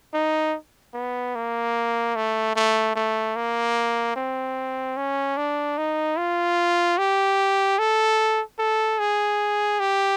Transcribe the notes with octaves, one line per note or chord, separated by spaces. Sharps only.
D#4
B3
A#3
A3
A3
A3
A#3
C4
C#4
D4
D#4
F4
G4
A4
A4
G#4
G4